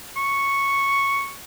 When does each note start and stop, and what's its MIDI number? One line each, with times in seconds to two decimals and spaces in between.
0.16 1.32 85